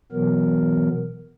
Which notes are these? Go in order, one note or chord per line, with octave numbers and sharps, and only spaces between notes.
B2 E3 F#3 B3 A#4